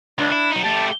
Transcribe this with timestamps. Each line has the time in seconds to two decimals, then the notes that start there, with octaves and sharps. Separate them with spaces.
0.18 C#2 D4
0.32 E4
0.51 F#3 D#4
0.63 A3 G4 A5